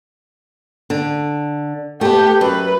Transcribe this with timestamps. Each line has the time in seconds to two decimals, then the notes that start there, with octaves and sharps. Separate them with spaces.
0.90 D3
2.01 A3 B3 G4
2.41 F#2 B4